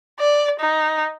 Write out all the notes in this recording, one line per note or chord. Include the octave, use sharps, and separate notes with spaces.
D5
D#4